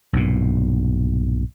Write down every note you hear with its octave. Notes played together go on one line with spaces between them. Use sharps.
B1 G2 A#2